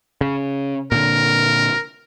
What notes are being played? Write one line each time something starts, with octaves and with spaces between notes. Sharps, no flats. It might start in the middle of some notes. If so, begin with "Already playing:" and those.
C#3
A#2 D3 A#4